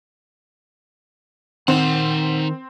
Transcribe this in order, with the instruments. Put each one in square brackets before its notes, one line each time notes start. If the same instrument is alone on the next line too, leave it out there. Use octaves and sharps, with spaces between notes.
[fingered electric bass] D#3 [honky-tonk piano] C4 [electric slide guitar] D#4 F#5